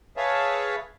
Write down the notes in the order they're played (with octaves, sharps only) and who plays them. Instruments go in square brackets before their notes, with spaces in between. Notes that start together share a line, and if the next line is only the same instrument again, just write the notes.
[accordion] G#4 B4 C#5 E5 F5 A5